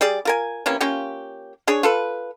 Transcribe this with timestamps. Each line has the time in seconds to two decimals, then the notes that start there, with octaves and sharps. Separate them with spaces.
0.01 G3 G#4 D5
0.25 F4 A#4 G#5
0.66 C3 E3 A#3 C#4
0.81 A#3 C#4 F4 G4
1.67 D4 G#4 C#5
1.83 F4 A4 B4